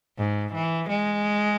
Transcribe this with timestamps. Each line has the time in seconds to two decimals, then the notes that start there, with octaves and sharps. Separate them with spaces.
0.18 G#2
0.54 E3
0.89 G#3